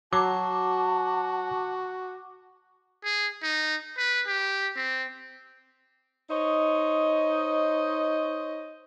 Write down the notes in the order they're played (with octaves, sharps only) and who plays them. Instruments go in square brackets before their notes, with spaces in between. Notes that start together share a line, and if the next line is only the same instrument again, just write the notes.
[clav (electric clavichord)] F#3 [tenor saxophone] F#4 [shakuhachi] A5 [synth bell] D6
[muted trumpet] G#4
D#4
B4
G4
C4
[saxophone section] D#4 C5 C#5 D#5